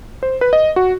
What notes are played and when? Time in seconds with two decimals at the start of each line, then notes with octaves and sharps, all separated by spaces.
0.23 C5
0.41 B4
0.53 D#5
0.76 F#4